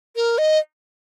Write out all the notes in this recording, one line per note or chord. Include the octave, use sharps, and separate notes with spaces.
A#4
D#5